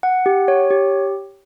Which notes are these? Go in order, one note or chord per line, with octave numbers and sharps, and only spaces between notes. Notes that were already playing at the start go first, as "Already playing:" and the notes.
F#5
G4
C#5
G4